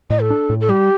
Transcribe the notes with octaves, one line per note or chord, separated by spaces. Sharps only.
A2 D#5
A4
D4
A2
A4
G3 G4